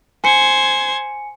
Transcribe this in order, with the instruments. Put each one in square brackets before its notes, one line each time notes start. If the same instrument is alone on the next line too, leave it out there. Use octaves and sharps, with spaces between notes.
[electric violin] C5 G#6 [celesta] G#5 C#7